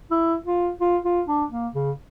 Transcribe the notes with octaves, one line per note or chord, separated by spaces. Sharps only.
E4
F4
F4
F4
D4
A#3
C#3